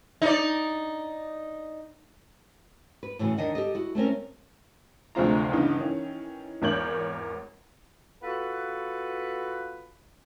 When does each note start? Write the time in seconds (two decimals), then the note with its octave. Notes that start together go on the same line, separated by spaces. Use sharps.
0.22 D#4 D5
3.03 B4
3.19 A2 C#3 E3 A3 F#4
3.38 D#2 D#3 D4 D#5 F#5
3.55 G4 A4 D#5
3.75 E4 F#4
3.95 A3 C4 C#4 A#4
5.15 F1 D2 G#3 C4 F4 A#5
5.52 G2 C#3 E3 B3 D#4
5.78 D#3 E3 C#4
6.62 G#1 E2 A#4 C#5 G6 F#7
8.23 B3 F4 F#4 A4 B4